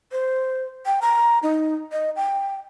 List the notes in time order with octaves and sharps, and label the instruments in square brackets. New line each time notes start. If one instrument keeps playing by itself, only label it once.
[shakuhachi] C5
G5
A#5
D#4
D#5
G5